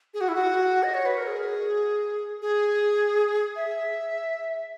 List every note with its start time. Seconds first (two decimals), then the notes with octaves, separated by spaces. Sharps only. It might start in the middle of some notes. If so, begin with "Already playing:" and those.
0.14 G#4
0.21 F#4
0.28 E4
0.35 F#4
0.83 D#5
0.94 C#5
1.06 B4
1.17 A#4
1.27 G#4
2.42 G#4
3.56 E5